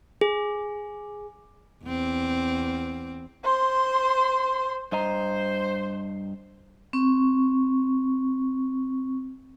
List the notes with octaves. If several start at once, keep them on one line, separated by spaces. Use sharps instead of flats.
G#4
E2 C4
C5 C6
G2 C5 D#5 A#5
C4 C#6